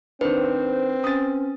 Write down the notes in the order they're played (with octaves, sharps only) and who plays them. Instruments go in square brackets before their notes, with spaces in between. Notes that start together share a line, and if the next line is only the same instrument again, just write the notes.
[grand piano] D#3 D4 [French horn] C4 [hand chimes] B4 [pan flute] C5
[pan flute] C#4 [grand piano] D#6 A6